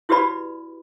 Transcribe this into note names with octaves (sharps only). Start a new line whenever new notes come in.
E4 F#4 G4 B4 D5 B5